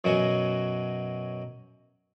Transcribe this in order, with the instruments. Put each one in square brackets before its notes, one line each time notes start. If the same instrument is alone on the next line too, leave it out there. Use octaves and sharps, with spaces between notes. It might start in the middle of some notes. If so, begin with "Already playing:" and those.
[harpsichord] F#2 B2 F#3 F#4 G#5